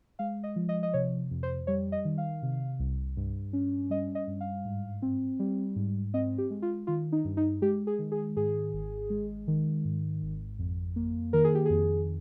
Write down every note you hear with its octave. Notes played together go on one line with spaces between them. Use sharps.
G#3 F5
D#5
F3
D#5
D#5
C3 C#5
F2
C5
G3 C#5
D#5
D#3
F5
C3
C2
G2
C#4
G3 D#5
D#5
G2
F5
G#2
C4
G3
G#2
C4 D#5
G4
G#3
F4
D#3 F4
D#4
G2
D#4
G#3 G4
G#4
D#3
G#4
G#2 G#4
G#1
G#3
D#3
G#2
G#1
F2
A#3
D#3 A#4
G#4
G4
F2 G#4